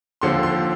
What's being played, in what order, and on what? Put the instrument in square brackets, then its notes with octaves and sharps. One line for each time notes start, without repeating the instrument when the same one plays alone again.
[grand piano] D#2 D3 F3 C4 C6
C6